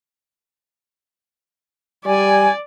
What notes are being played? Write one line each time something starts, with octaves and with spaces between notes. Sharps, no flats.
G3 D5 G#5